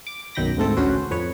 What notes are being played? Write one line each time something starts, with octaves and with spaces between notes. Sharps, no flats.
D6
B1 F#2 D#3 G5 B5 A#6
D2 G#2 A3 C4 A4
A1 D2 C#4 F#4 B4 C5
C5
F2 B4 C#5